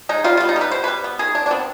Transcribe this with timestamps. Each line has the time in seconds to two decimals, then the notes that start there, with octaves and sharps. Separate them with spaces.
0.09 G#3 D#4
0.24 G3 F4
0.37 B3 F4
0.49 D#4
0.56 G3
0.61 B4
0.71 B3 C5
0.84 G3 B4
1.04 B3
1.19 D#3 G#4
1.35 D#3 D4
1.46 D4
1.51 B3 C4